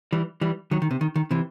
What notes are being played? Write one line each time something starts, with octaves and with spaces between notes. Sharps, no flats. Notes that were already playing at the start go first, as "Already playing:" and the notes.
E3 G3
E3 G3
D#3 F#3
D#3
C3
D#3
D#3
C3 E3